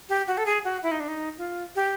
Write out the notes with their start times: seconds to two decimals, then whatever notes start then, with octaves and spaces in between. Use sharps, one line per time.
0.09 G4
0.27 F#4
0.38 A4
0.46 G#4
0.64 F#4
0.83 E4
0.91 D#4
1.00 D4
1.08 D#4
1.38 F4
1.76 G4